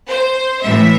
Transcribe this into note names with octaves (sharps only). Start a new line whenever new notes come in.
C5
A2 E3 E5